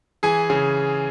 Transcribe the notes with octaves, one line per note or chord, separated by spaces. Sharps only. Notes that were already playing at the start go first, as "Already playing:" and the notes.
E3 G#4 G#5
C#3